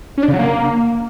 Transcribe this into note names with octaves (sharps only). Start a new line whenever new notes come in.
C#4
D4
C#3
F#3
A#3